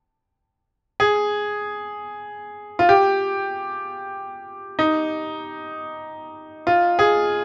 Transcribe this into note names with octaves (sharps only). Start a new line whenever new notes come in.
G#4
F4
G4
D#4
F4
G#4